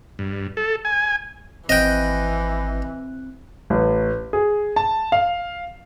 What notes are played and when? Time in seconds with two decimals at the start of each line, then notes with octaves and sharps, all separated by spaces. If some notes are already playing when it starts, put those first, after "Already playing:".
0.19 G2
0.57 A4
0.85 G#5
1.69 G#1 E3 C4 D#5 G5 F#6
3.70 A1
4.33 G#4
4.76 A5
5.12 F5